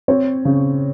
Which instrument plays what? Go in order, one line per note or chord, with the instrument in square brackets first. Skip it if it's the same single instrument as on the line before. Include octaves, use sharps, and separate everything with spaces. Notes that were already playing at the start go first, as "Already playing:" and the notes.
[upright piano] C4 C#5
C#3